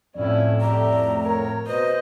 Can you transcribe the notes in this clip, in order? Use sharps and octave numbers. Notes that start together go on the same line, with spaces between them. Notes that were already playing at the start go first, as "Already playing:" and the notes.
F2 A2 C#4 E4 D5
G4 D5 E5 A#5
A#4 C#5
B2 B4 C5 D#5